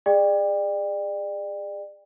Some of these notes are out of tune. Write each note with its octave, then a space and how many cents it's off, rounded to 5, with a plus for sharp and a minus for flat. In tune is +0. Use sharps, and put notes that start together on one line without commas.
G#4 -25 D5 +30 G5 +30